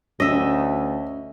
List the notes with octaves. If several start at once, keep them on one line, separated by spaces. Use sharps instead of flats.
D2 C#4 D#5 E5